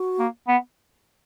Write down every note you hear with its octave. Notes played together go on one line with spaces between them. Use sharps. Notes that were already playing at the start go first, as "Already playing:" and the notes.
Already playing: F#4
A#3
B3